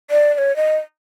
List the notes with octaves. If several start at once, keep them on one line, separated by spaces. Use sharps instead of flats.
D5
D5
C#5
D#5